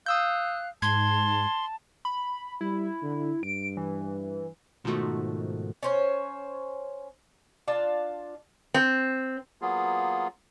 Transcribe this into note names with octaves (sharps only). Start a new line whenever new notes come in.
F5 D#6 E6 F#6 G6
G#2 A5 C6 G#6
B5
G3 E4
D3
G2 D7
E3
G#2 B2 D#3 F3 A3 F#4
C#4 C5 C#5
D4 F4 A5
C4
F#3 A#3 B3 F4 G#4